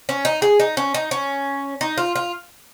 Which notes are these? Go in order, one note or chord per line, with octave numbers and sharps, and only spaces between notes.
C#4
D#4
G#4
D#4
C#4
D#4
C#4
D#4
F4
F4